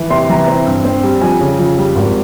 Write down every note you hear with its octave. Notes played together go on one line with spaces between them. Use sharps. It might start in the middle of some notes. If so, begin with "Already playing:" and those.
Already playing: E3
C3 C6
E3 A#5
C4
G2
C4
G3
F2 G#5
C#3
F2
G3
G#1